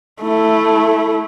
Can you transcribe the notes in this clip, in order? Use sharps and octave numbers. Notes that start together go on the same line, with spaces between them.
A3 E4